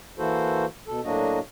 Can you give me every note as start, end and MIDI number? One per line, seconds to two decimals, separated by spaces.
0.18 0.65 52
0.18 0.65 58
0.18 0.65 64
0.18 0.65 66
0.18 0.65 69
0.18 0.65 72
0.87 1.01 47
0.87 1.01 69
1.04 1.39 45
1.04 1.39 54
1.04 1.39 58
1.04 1.39 62
1.04 1.39 66
1.04 1.39 75